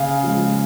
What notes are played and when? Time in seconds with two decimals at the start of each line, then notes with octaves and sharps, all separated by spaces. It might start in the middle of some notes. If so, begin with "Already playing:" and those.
Already playing: C#3 F5 G#5
0.23 F3 G#3